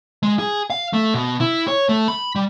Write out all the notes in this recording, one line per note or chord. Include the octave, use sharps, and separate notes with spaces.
G#3
G#4
F5
A3
B2
E4
C#5
A3
B5
G3